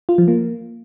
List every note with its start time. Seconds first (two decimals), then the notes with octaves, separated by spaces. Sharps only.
0.09 F4
0.18 F3
0.28 A#3